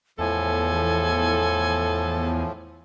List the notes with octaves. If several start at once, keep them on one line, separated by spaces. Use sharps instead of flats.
E2 A2 F3 A4 G#5